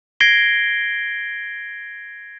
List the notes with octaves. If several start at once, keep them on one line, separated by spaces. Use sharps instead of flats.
G#6 A#6 C7 D7 G7